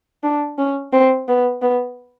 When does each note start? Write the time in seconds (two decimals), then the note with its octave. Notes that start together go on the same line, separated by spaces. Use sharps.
0.24 D4
0.58 C#4
0.93 C4
1.28 B3
1.62 B3